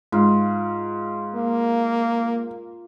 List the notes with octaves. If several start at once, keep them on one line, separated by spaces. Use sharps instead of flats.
G#2 F4
A#3